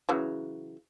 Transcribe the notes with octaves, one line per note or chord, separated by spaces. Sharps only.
C#3 E3 F#3